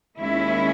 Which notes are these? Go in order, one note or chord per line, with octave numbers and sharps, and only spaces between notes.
D#2 D#3 G#3 C#4 E4